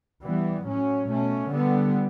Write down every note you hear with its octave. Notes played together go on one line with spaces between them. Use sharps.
E3 G3 B3
A2 F#3 C#4
B2 A3 C#4
D3 G3 B3